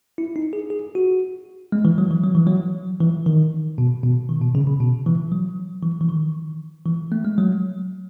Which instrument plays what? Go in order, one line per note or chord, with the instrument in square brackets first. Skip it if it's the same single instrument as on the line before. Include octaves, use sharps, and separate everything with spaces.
[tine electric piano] E4
D#4
G#4
G#4
F#4
G#3
E3
F#3
E3
F#3
E3
F#3
E3
D#3
B2
B2
D#3
B2
C#3
C#3
B2
E3
F#3
E3
E3
D#3
E3
A3
G#3
F#3